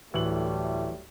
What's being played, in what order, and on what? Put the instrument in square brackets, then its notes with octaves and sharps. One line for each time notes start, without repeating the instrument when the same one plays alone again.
[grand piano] D1 F#7 [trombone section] A2 G3 A3 [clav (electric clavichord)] E3